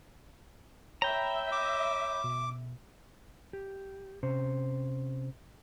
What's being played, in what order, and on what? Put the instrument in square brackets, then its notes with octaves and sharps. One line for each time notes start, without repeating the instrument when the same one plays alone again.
[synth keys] C#5 B5 [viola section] E5 [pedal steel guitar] G5 A#5
[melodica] D6
[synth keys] B2
[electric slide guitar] G4
C3 C#4 C5